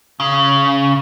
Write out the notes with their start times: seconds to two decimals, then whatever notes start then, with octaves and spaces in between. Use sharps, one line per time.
0.20 C#3